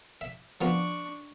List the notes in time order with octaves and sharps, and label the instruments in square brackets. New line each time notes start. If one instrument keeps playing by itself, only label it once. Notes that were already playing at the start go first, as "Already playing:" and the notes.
[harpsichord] E5
[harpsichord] F3 B3 F4 [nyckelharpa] D4 C#6